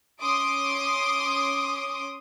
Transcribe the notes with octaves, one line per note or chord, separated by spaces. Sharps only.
C#4 C6 D6 D#6